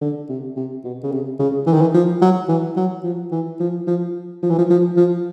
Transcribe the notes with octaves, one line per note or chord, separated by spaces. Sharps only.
D3
C3
C3
B2
C#3
C3
C#3
E3
D#3
E3
F3
F#3
E3
F#3
F3
E3
F3
F3
F3
E3
F3
F3
F3